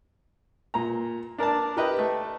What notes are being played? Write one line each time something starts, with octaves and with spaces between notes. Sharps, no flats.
A#2 A#5
D4 A#4 D5 A5
G4 A#4 B4 D#5 G5
A3